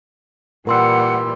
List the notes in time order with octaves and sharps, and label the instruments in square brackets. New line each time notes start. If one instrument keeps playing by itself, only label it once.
[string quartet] A#2 E3 G3 [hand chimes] A#4 C6 E6 [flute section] F#5